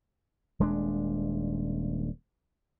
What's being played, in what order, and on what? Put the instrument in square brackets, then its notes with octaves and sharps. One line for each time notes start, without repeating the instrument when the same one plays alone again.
[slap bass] D#1 G#3 A#3 D4